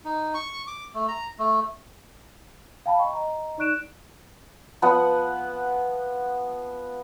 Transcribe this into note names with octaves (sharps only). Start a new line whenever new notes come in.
D#4
C#6
D6
A3
A#5
A3
F5 G5 A5 B5
D#5 G5 C#6
D#5 A#5
D#4 D5 C#6 F#6 D7 E7
F3 B3 F#5